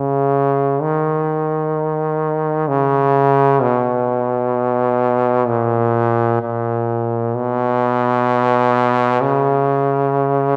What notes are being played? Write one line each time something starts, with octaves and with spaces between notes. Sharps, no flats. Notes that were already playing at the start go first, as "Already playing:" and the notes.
Already playing: C#3
D#3
C#3
B2
A#2
A#2
B2
C#3